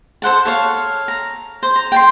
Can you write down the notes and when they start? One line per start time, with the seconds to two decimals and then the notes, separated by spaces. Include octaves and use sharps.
0.22 A4 C5 F#5 A5
0.45 A4 C#5 F5
1.08 A#5
1.63 C5
1.76 A#5
1.92 G5 A5 C6